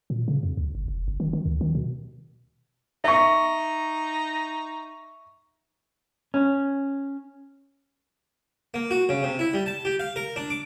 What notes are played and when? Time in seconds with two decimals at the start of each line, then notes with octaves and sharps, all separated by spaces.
0.10 A#2
0.28 C#3
0.43 F2
0.57 D2
0.75 G1
0.88 F1
1.08 F#1
1.20 D#3
1.33 D#3
1.46 D2
1.61 D#3
1.75 B2
3.04 D#4 E5 C#6
6.34 C#4
8.74 A#3
8.91 F#4
9.09 C#3
9.23 C3
9.39 E4
9.54 G3
9.66 A5
9.85 G4
9.99 F5
10.16 A#4
10.36 D4
10.50 D6